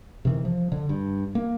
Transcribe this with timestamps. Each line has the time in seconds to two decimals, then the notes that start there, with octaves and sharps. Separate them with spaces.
0.25 C3 D#3 E3
0.45 F3
0.72 D3
0.89 G2
1.35 A#3